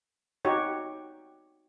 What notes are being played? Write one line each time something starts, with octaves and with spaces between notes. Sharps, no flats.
D#4 F#4 G4 C#5